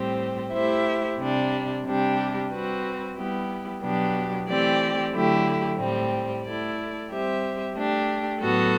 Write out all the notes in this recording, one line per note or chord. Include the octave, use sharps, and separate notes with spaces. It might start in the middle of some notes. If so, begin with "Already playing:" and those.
Already playing: A2 G3 C4 G4 C5
A3 E4 G4 C5 E5
C3 G3 D4
C3 G3 D4 G4
G3 C4 F#4 B4
G3 B3 E4 G4
B2 F#3 B3 D4 G4
E3 A3 C4 G4 D5
D3 F#3 A3 E4 G4
A2 G3 C4
A3 E4 A4 D5
G3 C4 G4 C5 E5
A3 D4 G4
A2 F#3 B3 F#4 A4